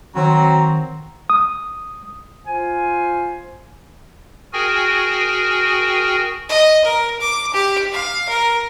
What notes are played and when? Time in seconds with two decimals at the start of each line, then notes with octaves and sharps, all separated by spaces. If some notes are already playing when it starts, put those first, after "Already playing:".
0.16 D#3 F#3 C4 A#5
1.30 D#6
2.46 F4 C5 G#5
4.53 F#4 G#4 A#4 G5 G#5
6.49 D#5
6.84 A#4
7.21 D6
7.53 G4
7.92 F5
8.28 A#4